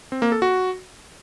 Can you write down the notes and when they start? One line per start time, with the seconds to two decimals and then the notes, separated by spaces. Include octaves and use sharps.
0.12 C4
0.22 A#3
0.32 A4
0.42 F#4